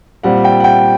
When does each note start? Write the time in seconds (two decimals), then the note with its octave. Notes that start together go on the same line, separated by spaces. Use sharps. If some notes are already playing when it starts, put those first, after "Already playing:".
0.23 A#2 G3 C4 F#5
0.44 G5
0.60 F#5
0.64 G5